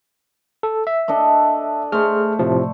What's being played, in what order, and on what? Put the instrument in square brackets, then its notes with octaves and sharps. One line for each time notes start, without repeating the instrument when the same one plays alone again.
[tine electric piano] A4
E5
[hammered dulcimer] D4 A4 D#5
[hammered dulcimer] A3 C5 [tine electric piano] G#4 F6
[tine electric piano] A2 C3 F3